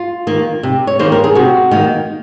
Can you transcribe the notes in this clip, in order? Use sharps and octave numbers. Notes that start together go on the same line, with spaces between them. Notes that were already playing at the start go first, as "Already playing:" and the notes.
Already playing: F4
D#3 A#3
C3
C#5
D#3 A#3 C5
A#4
G#4
C3 F#4
D#3 A#3